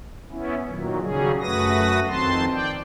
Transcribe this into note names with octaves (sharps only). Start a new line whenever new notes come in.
B3 C#4 E4
A#2 D#3 F#3
C#3 F#3 G3 C#4 G#4
F#2 A3 F#4 B4 D#6 A#6
F2 D#3 C4 A5 C6
D5 G5